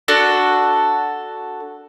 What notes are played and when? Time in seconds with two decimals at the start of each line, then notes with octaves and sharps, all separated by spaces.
0.08 D4 F#4 A4